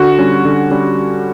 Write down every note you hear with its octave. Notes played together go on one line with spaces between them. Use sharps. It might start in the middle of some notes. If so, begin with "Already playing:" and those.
Already playing: D3 F#4
G3 C#4
D3
G3 C#4